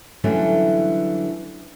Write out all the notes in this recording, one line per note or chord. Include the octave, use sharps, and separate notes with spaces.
D3 E3 F#3 G3 A3 C#4